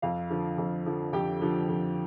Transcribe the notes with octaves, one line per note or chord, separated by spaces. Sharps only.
F2 F4 F5
D3 F3
F2
D3 F3
F2 G4 G5
D3 F3
F2